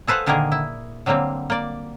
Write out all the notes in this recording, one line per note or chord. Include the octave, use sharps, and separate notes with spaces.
G#4 A4 B4 C5 F5 F#5
A#2 D3 D#3 A#3 G#4 A#4
E4
D3 F#3 G3 A#3 C4
A#3 D5